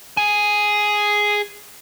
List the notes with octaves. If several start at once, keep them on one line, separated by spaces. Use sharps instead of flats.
G#4 G#5